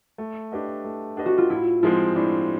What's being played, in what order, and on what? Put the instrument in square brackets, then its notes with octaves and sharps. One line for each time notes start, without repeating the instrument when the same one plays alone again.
[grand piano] A3
D4 G4 B4 D#5
A3
D4 G4 B4 D#5
[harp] F#4
F4
[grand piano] A2 [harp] E4
[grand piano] F3 G#3 C4 [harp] E4
[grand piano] A2 [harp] D4